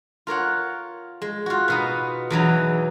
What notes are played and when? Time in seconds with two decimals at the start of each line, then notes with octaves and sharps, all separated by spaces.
0.27 F4 A#4 C#5 F#5
1.22 G#3
1.46 F4 F#4
1.68 B2 B3 D#4
2.30 E2 E3 F#3 D#4